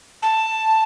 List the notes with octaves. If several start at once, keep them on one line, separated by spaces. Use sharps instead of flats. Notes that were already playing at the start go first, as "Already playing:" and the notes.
A5